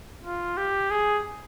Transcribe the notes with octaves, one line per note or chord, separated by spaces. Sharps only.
F4
G4
G#4